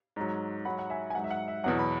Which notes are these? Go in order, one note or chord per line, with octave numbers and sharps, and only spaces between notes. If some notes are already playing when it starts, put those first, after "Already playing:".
G#2 F#3
G#2 F#3 F#5 B5
F#5
E5 G#5
G#5
G#2 F#3 F#5
E5
F#5
E5
E2 B2 F#3 F#5
B5